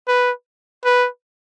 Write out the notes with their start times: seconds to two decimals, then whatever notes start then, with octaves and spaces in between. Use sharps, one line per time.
0.08 B4
0.85 B4